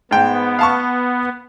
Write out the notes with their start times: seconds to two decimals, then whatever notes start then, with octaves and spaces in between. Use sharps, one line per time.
0.11 G#2 B3 G5
0.59 F5 A5 C#6